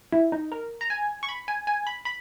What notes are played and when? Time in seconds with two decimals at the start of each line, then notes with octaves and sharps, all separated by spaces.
0.13 E4
0.32 D#4
0.52 A#4
0.81 A#5
0.90 G#5
1.23 C#6
1.29 B5
1.48 G#5
1.67 G#5
1.87 B5
2.05 B5